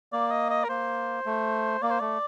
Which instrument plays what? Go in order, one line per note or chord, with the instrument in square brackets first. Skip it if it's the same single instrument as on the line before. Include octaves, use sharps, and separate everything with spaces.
[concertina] A#3 [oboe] D5
[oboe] D#5
D#5
A#4
[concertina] A#3 [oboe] C5
[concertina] A3
[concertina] A#3 [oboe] D5
[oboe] C5
[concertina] A3 [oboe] D5